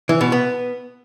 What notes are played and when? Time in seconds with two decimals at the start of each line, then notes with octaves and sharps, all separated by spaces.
0.09 E3
0.21 B2
0.32 B3